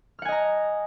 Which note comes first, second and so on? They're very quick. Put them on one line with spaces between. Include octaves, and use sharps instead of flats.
F6 F#5 G#5 D#5 A#5